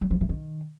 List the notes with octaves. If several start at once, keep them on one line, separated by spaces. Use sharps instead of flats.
F#3
F3
E3
D#3